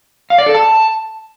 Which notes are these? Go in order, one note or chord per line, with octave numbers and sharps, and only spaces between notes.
F5
D5
A4
A5